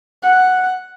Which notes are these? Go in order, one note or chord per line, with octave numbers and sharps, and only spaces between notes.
F#5